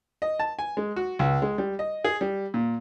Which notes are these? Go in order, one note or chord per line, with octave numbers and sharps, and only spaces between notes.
D#5
A5
G#5
G#3
F#4
C#2
G#3
G3
D#5
G#4
G3
A#2